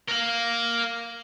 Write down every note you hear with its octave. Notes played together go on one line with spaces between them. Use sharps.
A#4 F5